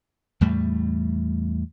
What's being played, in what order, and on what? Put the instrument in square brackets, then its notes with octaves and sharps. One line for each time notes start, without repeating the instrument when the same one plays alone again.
[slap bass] E2 A2 G3 A3